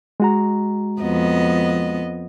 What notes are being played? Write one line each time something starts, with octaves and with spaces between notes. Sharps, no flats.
G#3 F#4 A#5
F2 B3 D#5